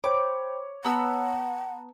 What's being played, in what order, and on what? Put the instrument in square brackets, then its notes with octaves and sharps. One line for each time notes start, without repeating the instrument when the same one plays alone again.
[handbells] C5 G5 B5 [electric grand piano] C#5 [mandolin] D6
[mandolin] B3 E6 [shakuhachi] F#5 [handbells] A5 A#5